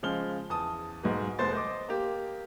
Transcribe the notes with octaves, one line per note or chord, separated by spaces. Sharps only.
C#3 F3 G#3 F6 G7
E2 A5 D#6
B1 G#2 F#4 B4
F1 G#3 B3 C5 C6 A6
C5 D#5 D6
A#3 G4